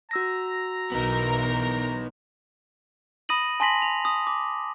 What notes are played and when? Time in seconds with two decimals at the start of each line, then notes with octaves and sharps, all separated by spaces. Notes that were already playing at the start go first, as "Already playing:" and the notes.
0.11 F#4 A#5 E6 A#6
0.92 B1 E3 B3 D#4 A#4
3.29 B5 D#6 A#6 D#7 F#7
3.60 G#5 A5 C6 A#6 B6 F#7
3.82 F7
4.05 D#6
4.27 D6